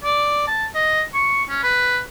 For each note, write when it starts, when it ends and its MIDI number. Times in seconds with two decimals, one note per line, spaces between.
0.04 0.44 74
0.48 0.66 81
0.75 1.02 75
1.14 1.43 85
1.49 1.61 61
1.63 2.00 71